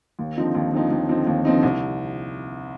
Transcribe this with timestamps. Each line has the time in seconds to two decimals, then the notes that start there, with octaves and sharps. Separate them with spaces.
0.19 D#2
0.37 D3 F3 C4 D#4
0.55 D#2
0.73 D3 F3 C4 D#4
0.91 D#2
1.09 D3 F3 C4 D#4
1.27 D#2
1.45 D3 F3 C4 D#4
1.63 C2